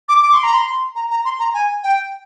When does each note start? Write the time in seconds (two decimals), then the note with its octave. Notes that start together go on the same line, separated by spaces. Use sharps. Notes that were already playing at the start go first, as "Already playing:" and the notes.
0.09 D6
0.22 D6
0.33 C6
0.44 A#5
0.53 C6
0.96 A#5
1.10 A#5
1.25 C6
1.39 A#5
1.54 G#5
1.84 G5